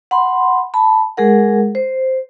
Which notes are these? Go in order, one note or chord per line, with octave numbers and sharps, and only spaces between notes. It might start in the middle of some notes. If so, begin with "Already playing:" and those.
F#5 B5 C6
A5 B5
G#3 G#4 A#4 F#5
C5